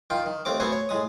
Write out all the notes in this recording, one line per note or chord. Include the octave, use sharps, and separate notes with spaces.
D#3 F4 G5
D#3
D#2 A3 C4 D6
A3 B3 F#4 C5 G#5
C#5
A2 G#3 D#6